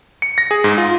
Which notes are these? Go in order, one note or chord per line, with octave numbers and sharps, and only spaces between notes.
C#7
A#6
G#4
G#2
F4